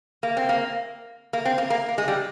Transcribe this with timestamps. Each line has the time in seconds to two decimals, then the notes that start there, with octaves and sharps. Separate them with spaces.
0.23 A#3
0.37 C4
0.49 A#3
1.33 A#3
1.45 C4
1.58 A#3
1.70 A#3
1.89 A#3
1.98 G#3
2.08 G3